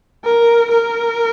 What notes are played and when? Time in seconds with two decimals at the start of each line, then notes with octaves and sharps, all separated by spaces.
0.25 A#4
0.71 A#4